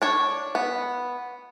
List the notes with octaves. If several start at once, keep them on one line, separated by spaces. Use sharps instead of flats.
D4 C#5
B3